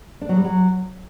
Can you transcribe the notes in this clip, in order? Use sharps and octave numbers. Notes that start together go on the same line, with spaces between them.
D4
F#3
G3
F#3